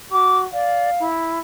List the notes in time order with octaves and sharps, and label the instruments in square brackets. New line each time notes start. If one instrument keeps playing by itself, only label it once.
[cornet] F#4 [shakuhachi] D6
[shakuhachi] D5 [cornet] F5
[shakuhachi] E4